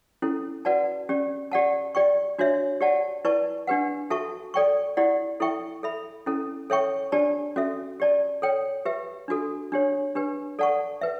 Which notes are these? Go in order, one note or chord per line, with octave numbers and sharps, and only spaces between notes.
C#4 E4 A4
F#4 B4 D5 F#5 A5
C#4 G4 D5
G4 D5 F#5 A5
G4 D5 G5 C#6
D4 F#4 C#5 E5
G4 D5 F#5 A5
E4 B4 D5 A5 C#6
D4 G4 B4 F#5
F#4 A4 E5 A5 C#6
A4 D5 G5 C#6
E4 G4 D5 F#5
E4 A4 E5 G5 C#6
A4 E5 B5
C#4 E4 A4
A4 C#5 E5 G5 C#6
D4 G4 D5 A5
C#4 F#4 A4 E5
G4 D5 A5
A4 C#5 G5
G4 B4 E5
D4 F#4 A4
D4 G4 C#5
D4 G4 B4
A4 D5 F#5 A5 C#6
B4 E5